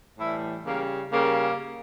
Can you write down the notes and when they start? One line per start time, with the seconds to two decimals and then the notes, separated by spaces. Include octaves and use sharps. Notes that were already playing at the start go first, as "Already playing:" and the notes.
0.18 A2 E3 G3 E4
0.65 C#3 G3 A#3
1.12 C#3 G3 A#3